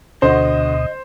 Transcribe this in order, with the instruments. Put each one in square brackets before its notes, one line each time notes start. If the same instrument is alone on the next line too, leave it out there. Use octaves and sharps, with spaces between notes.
[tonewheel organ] D2 B2 D#6 [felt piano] D3 F#4 [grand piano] C5 [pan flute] D#5